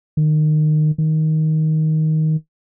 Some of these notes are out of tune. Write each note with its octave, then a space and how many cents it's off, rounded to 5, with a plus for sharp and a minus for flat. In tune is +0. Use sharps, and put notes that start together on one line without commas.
D#3 -25
D#3 +10